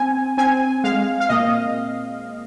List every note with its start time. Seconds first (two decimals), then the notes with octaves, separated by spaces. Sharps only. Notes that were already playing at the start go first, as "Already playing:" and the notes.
Already playing: C4 G#5
0.37 C4 G#5
0.84 G#3 F5
1.20 F5
1.29 A#2 D#5